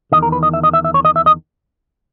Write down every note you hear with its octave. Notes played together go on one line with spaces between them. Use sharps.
E2 D#3 D#5
A#4
B4
D#5
E5
D#5
E5
E5
C#5
D#5
E5
D#5